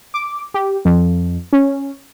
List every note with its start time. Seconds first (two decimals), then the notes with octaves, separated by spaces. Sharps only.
0.14 D6
0.54 G4
0.85 F2
1.53 C#4